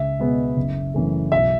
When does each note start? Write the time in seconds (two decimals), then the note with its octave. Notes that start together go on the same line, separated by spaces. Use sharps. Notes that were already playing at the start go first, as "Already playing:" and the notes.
Already playing: C#2 E5
0.19 B2 G#3 B3
0.57 F#1
0.94 F#2 E3 A3
1.32 B1 E5